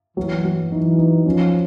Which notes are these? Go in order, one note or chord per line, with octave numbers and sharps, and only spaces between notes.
E3 F#3
F#3
E3 D#4
D#4
F3 C#4